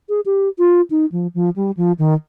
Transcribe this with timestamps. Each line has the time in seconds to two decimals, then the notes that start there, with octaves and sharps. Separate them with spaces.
0.09 G#4
0.26 G4
0.58 F4
0.90 D#4
1.12 F3
1.34 F3
1.56 G3
1.77 F3
1.99 D#3